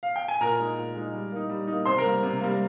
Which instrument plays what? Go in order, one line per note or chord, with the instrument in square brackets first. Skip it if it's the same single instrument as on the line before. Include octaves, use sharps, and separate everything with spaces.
[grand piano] F5
G5
G#5
A#2 A#4 A#5
G#3 D#4
A#2
G#3 D#4
G3
A#3 D#4
G3
A#3 D#4
C3 C5 C6
A#4 A#5
G3 A#3
C3
G3 A#3